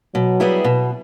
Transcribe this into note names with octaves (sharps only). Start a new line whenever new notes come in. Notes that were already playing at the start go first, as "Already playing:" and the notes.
B2 F#3
G3 B3 E4 G#4
B2